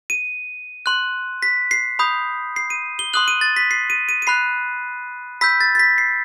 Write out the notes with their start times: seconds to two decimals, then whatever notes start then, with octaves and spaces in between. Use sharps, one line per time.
0.10 D#7
0.86 C6 F#6
1.42 B6
1.71 C7
1.99 B5 D#6 G6
2.56 C7
2.70 D#7
2.99 G7
3.13 C6 D#6 F#6 F#7
3.28 D#7
3.41 A6
3.56 B6
3.71 C7
3.90 D#7
4.09 D#7
4.22 D#7
4.27 B5 F#6 C7
5.41 B5 E6 G6 B6
5.61 A6
5.75 A6
5.79 B6
5.98 C7